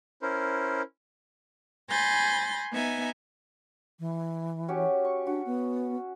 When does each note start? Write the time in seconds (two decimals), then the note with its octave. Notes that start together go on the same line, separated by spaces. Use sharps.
0.22 C#4 E4 A#4 C5
1.89 G#5 B5 C6 G6 A6 A#6
2.72 B3 D#4 E5 G#5
3.99 E3
4.68 C#4 F#4 G4
5.05 C#6
5.27 D4 F#4
5.46 B3